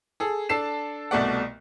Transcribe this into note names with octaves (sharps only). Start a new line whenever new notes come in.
G#4 A4
D4 A4 A5 C7 E7
C2 B2 A3 D5 F#5